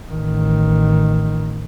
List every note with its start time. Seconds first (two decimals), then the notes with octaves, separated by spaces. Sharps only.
0.10 A1 D#3